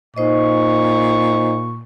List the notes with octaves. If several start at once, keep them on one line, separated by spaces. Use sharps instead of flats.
A#2 D#4 C5 D#5 C#6